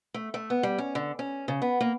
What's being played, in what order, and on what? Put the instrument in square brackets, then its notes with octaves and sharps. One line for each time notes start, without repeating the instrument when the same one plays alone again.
[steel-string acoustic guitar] A3
A3
B3
G3
C#4
D3
C#4
C#3
B3
A#3